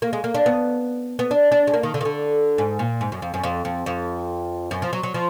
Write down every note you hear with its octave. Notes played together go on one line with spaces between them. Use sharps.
A#3
G#3
A#3
D4
B3
B3
D4
D4
G#3
A#3
D#3
D3
D#3
D3
G#2
A#2
G#2
F#2
F2
F#2
F2
F2
F2
F#2
F3
F#3
F#3
F3